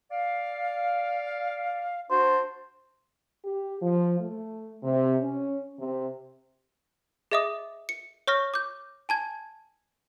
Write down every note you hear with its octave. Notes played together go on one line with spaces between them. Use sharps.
D5 F5
D4 F#4 C5
G4
F3
A3
C3
C#4
C3
G#4 D#5 E5 D6 D#6
C#7
C#5 C#6 F6 A#6
D6 G6
G#5 A5 G#6